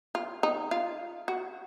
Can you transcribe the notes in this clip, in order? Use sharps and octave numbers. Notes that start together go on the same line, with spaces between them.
F4
D#4
F4
F#4